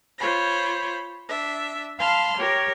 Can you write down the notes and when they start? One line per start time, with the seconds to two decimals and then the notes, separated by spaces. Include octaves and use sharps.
0.18 F4 C5 C#5 B5
1.28 D4 E5
1.99 F5 A5 B5 C6 F6
2.37 G4 A#4 C#5